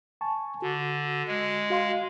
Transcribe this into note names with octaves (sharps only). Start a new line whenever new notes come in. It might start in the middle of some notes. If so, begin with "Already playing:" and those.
G#5 A5 C#6
D3 F#4
G#3
F#4 F5 C6